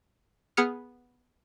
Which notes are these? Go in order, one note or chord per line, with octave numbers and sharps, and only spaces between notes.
B3 G#4 D#6 F6 C#7